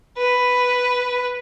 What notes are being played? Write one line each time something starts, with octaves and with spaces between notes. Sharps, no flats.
B4